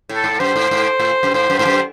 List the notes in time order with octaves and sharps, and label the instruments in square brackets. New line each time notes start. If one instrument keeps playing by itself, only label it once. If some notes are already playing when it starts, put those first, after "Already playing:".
[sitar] A2
[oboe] A4
[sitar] G#2
[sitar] F#2 [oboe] C5
[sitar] G#2
G#2
A2
F#2
[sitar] G#2 [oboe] C5
[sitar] F#2
[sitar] G#2 [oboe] C5
[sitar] F#2